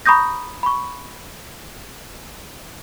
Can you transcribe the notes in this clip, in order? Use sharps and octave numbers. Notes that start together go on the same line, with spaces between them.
A#5 B5 C#6 D#6 G6 A#6
B5 C#6